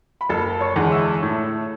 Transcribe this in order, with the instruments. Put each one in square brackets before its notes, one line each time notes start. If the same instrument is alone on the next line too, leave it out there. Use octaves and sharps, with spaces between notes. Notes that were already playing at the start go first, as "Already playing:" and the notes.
[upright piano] B5
[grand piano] F#1 [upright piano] A4 A5
[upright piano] C#5 C#6
[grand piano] E2 D3 G#3
[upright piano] E5 E6
[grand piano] A2